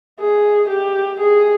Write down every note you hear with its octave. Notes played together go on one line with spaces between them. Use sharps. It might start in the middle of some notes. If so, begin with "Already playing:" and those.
G#4
G4
G#4